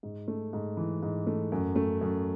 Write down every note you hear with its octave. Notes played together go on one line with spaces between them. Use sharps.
G#2
A3
G#2
E3
G#2
A3
F#2
A3
F#2